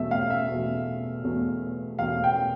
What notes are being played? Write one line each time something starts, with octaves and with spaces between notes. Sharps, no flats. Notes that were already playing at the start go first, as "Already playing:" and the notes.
Already playing: E2 B2 A3 E5
F5
E5
E2 B2 A3
E2 B2 A3
E2 B2 A3 F5
G5